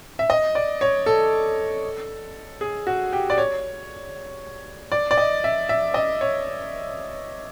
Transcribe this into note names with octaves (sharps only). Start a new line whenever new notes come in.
E5
D#5
D5
C#5
A4
G#4
F#4
G4
D5
C#5
D5
D5
D#5
E5
E5
D#5
C#5